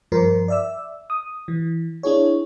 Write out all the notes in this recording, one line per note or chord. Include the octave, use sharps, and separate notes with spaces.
G2 F3 A#4 C5
D5 E5 E6
D#6
E3
D4 E4 G#4 C#5